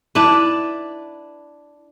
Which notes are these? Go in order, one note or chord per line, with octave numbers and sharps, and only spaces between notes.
D4 E4 B4